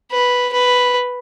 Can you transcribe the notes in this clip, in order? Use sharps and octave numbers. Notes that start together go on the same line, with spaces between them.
B4
B4